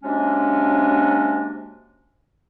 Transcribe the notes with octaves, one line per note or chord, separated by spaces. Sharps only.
C3 F#3 G#3 A#3 C#4 D4